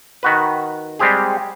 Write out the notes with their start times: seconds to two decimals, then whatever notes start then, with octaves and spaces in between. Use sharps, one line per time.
0.23 D#3 F#4 B4
0.99 G3 G#3 C4 G4 G#4